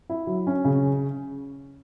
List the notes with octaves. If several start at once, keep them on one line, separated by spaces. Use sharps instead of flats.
E4
F#3
C#4
C#3